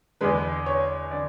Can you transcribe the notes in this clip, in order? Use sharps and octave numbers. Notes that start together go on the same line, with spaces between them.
E2 D3 G#3 B4
C#5
D3 D5